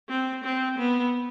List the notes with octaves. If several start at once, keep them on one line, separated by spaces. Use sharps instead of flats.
C4
C4
B3